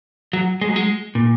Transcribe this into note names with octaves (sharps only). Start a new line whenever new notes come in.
F#3
G#3
F#3
G#3
A#2